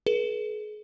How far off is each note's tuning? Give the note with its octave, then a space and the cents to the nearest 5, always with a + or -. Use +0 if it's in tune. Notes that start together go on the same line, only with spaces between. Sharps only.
G#4 +35 B4 -45